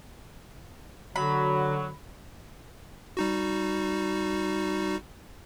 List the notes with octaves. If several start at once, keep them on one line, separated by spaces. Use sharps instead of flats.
D3 F#3 B5
G3 D#4 F#4